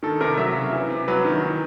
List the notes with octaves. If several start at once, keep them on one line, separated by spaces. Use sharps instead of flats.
D#3 A4
C3 A#4
F#3 E5
C#3
E3
C3
F#3 B4
D#3
E3